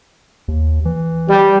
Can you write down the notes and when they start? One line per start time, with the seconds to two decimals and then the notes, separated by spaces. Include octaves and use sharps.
0.48 D#2
0.85 E3
1.29 G3